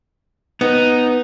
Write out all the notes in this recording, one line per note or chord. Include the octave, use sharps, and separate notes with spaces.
B3 D#4